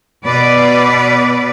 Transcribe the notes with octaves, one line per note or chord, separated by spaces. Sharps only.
B2 B4 D5